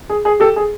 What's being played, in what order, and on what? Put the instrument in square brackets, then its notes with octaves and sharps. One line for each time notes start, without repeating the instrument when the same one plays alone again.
[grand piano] G#4
G#4
G4 A4
G#4